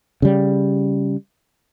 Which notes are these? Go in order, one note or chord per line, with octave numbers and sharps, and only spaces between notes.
C#3 G3